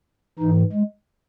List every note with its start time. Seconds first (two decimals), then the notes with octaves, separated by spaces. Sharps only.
0.39 G#2 E3 D#4
0.73 G#3